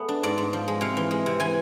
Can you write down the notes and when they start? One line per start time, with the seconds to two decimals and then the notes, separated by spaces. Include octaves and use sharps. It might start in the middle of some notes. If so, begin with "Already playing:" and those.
Already playing: A3 B3 G#4
0.09 D4
0.23 G#2 D5
0.38 G#2
0.53 F3
0.68 G#3
0.81 C3 F5
0.97 E3
1.11 G#3
1.26 C3
1.40 E3 G#5